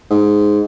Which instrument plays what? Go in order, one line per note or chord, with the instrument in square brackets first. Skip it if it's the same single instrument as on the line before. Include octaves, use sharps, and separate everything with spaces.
[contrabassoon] G#2